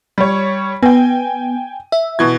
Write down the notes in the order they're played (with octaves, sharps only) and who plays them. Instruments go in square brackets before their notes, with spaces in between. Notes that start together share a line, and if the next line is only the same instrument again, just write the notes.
[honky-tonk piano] G3 C#5
[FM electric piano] B3 [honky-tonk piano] G5 G#5
[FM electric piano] E5
[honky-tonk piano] B2 E3 G#6